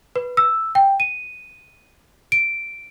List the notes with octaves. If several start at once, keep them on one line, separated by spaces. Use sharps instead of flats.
B4
E6
G5
D#7
D7